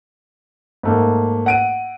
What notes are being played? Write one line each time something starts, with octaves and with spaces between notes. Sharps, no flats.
G#2 A3 A#3
F#5 D7 D#7